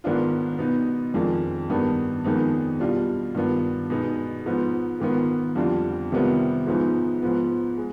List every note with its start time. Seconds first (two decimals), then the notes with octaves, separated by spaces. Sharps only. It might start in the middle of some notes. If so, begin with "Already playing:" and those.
0.04 G#2 D#3 B3 D4 F4
0.58 B2 B3 D#4
1.14 F2 D#3 G#3 D4 F4
1.70 G2 D#3 B3 D#4
2.24 F2 D#3 G#3 B3 D#4
2.80 B2 G3 D4 F4
3.35 G2 D#3 B3 F4
3.90 B2 G#3 B3 D#4
4.46 G#2 F3 B3 D#4
5.00 G#2 D#3 B3 F4
5.56 F2 D3 G3 D4 F4
6.12 C3 D#3 G3 B3 F4
6.67 G#2 F3 G#3 B3 D#4
7.22 G#2 F3 B3
7.77 G#3